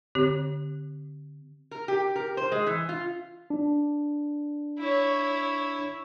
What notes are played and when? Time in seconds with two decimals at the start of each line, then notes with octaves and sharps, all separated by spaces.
0.15 D3 C4 G4 C#5
1.71 A#4
1.88 G4
2.16 A#4
2.37 C5
2.52 G#3
2.66 E3
2.89 F4
3.50 D4
4.79 E4 C#5